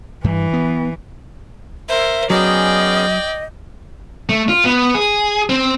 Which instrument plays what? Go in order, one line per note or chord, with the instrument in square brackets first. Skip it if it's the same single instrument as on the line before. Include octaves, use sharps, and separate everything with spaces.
[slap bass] G2 [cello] E3
[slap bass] B3
[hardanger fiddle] A#4 C5 [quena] E5
[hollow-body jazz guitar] F#3 [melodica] B3 C#4 G#4 [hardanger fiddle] D5 G5 [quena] D#5
[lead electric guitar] A3
F4
B3
G#4
C4